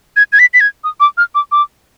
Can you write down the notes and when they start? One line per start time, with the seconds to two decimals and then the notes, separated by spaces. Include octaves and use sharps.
0.16 G#6
0.32 G#6
0.39 B6
0.54 B6
0.60 G#6
0.84 D#6
1.00 D6
1.17 F6
1.35 D6
1.52 D6